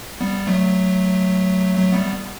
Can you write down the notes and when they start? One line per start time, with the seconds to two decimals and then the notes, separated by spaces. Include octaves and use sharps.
0.21 G3 B3
0.47 F#3 A3
1.75 F#3 A3
1.93 G3 B3